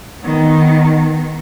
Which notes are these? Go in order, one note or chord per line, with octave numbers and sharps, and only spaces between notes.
D#3 B3